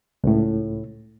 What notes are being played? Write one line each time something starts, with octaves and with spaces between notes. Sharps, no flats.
C#2 A2